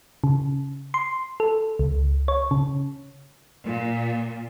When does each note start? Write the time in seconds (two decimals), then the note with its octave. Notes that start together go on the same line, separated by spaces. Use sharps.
0.24 C#3
0.94 C6
1.40 A4
1.79 C#2
2.28 C#5
2.51 C#3
3.65 A#2